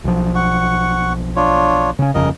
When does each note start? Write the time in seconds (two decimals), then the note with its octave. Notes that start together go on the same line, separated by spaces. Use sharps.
0.04 B1 F3
0.35 F#5 C#6
1.36 D4 F4 C#5
1.99 C#3 C#4
2.14 G1 F2 C#3 A#4 D#5